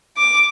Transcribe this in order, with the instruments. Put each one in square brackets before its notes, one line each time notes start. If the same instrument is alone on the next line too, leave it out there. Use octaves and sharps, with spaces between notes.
[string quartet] D6